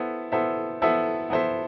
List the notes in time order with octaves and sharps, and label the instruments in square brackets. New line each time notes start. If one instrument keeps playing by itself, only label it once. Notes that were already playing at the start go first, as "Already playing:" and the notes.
Already playing: [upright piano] B3 E4 A4 C5 E5
B3 E4 A4 C5 E5
B3 E4 A4 C5 E5
B3 E4 A4 C5 E5